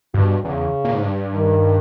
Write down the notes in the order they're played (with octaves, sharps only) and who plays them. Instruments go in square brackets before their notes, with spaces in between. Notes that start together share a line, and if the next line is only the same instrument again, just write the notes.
[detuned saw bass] G2 [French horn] B2
[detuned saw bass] E2 [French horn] C#3
[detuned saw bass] A#2
G#2
G2
[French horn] D#3